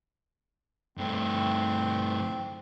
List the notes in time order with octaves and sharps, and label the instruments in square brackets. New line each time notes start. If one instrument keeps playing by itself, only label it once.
[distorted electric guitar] G2 A3 [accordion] C4